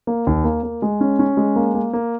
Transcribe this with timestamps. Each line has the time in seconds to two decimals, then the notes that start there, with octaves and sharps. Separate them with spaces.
0.07 A#3
0.27 D#2
0.45 A#3
0.63 A#3
0.82 G#3
1.01 C#4
1.19 C#4
1.37 G#3
1.56 A#3
1.74 A#3
1.93 A#3